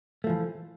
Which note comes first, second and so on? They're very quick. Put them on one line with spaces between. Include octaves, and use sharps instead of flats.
A3 F3 E3